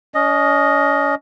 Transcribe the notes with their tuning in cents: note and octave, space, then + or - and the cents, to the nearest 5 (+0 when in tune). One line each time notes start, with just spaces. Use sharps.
C#4 +35 D#5 +0